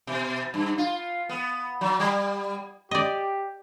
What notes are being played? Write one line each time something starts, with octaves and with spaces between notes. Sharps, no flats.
B2
G2
F4
B3
F#3
G3
G4 D5 D#5